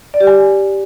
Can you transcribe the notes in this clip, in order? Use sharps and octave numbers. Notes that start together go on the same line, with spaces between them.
D5
G4
G#5